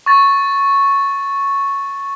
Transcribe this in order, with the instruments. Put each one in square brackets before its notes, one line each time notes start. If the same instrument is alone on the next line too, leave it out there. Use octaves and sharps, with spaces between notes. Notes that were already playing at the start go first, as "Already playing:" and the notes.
[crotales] C#6 A6